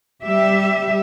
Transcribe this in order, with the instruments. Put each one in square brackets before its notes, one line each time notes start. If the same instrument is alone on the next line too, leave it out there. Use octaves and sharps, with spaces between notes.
[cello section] G3 G4 E5